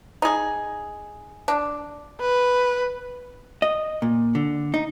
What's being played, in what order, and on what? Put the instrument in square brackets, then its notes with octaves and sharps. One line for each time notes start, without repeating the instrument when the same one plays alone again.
[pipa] D#4 G#4
D4
[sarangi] B4
[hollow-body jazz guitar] D#5
A#2
D3
D#4